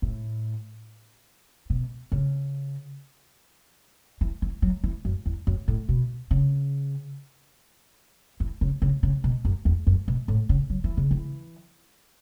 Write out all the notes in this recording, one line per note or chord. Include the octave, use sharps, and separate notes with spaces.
A2
B2
C#3
E3
E3
F#3
E3
F#2
E2
F#2
A2
B2
C#3
E3
C#3
C#3
C#3
B2
F#2
E2
F#2
B2
A2
C#3
F#3
E3
C#3
E3